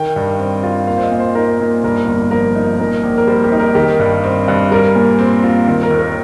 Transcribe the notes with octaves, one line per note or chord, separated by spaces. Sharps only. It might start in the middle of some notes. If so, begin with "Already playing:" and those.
Already playing: D#3 G5
G2
C4
F4
A#3 F5
C5
D#5
A#2
C5
D#4 A#4
A#2
G2 A#4
G1
F3 A#4
D#4
A#2 A#4
A#1
A#4
G3 C5
G4
D#4
A#4
D#3 G4
G2
C4
G2
G3 A#4
A#2
C4
F4
D#3
A#4
D#2
A#4